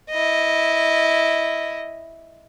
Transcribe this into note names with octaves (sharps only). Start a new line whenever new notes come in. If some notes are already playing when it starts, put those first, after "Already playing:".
E4 D#5